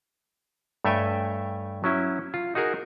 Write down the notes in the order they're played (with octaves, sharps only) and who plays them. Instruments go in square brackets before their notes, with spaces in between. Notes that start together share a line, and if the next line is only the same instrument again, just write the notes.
[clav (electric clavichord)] G2 A3 C#5 E5 G5 G#5
F#3 C#4 E4
F4
D#4 F#4 G#4 A#4